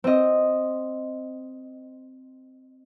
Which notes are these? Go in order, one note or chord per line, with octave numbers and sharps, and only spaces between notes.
C4 D#5